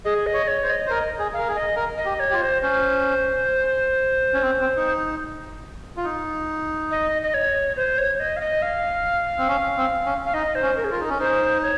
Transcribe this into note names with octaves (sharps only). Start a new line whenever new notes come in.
G#4 D#5
D#5
C#5
C#5
C5
D#5
C5
A#4 D#5
G#4
A#4 F5
G#4
D#5
A#4
D#5
G4
C#5
G4
F4
C5
C#4 C5
C#4
C4
C4
D#4
F4
D#4
D#5
D#5
C#5
C5
C#5
D#5
F5
D#5
F5
C4
C#4
C4
C#4
F5
D#4 D#5
C5
C#4
A#4
G#4
F4 A#4
D#4
C#4
D#4 C5
C#5